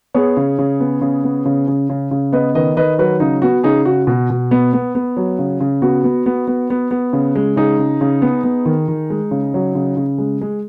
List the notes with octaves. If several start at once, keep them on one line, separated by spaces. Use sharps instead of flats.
B3 G#4 C#5
C#3
C#3
B3
C#3
B3
C#3
C#3
C#3
C#3
B3 B4 D#5
D#3 B4 D#5
D#3 B4 D#5
F#3 F#4 B4
C#3 D#4
B3 F#4
C#3 D#4 G#4
C#3 F#4
B2
B2
B3
B3
B3
F#3
C#3
C#3
B3 F#4
B3
B3
B3
B3
B3
C#3
G#3
C#3 D#4 G#4
C#3
C#3
B3
B3
D#3
D#3
G#3
C#3
F#3
C#3
C#3
G#3
G#3